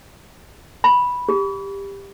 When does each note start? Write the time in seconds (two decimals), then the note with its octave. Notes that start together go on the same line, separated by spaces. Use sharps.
0.84 B5
1.29 G4